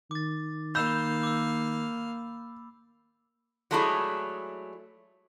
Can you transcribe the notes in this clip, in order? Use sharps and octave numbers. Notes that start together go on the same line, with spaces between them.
D#3 D6 A6
A#3 F5 B5 E6 G6 E7
D6 E6
F#3 G#3 A3 D4 E4 G#4